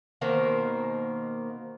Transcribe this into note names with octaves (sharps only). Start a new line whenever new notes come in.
B2 D#3 A#3 C5